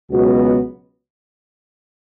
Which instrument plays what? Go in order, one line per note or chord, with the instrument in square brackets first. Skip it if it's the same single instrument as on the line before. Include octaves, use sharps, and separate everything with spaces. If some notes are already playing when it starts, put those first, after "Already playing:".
[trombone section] C#2 B2 F#3 B3 F#4